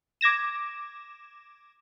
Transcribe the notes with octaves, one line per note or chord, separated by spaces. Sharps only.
D6 G#6 A#6 E7